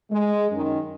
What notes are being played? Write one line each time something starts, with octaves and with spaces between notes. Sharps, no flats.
G#3
F#2 D#3